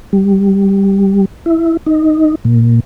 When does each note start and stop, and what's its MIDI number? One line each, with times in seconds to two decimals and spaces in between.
0.13 1.25 55
1.46 1.77 64
1.86 2.35 63
2.45 2.80 46